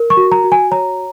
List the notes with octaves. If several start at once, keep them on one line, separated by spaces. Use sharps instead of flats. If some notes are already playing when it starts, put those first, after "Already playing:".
Already playing: A#4
C#6
F#4
A#5
F#4
G#5
C#5 A#5